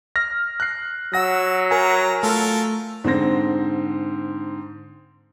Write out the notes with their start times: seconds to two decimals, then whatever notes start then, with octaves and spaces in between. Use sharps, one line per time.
0.16 F6 A#6
0.60 F#6 C7
1.14 F#3 F#5 E6 A#6
1.71 A#4 G#5 A#5
2.23 A3 F4 A4 A#4
3.04 G#2 D3 C4 C5 A#6